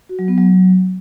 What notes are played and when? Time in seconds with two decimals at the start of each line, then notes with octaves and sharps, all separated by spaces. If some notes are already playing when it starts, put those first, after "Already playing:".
0.09 F#4
0.19 F#3
0.28 B3
0.38 F#3